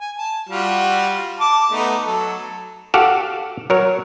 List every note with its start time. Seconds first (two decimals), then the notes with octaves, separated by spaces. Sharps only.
0.01 G#5
0.18 A5
0.49 G3 F4 F#4
1.40 A5 D6
1.71 A3 B3 D#4
2.06 F#3 A4
2.94 F#4 G4 A4 F5 F#5
3.70 F#3 A#4 C#5